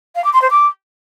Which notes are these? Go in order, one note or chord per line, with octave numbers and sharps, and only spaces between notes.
F5
D6
C6
C5
D6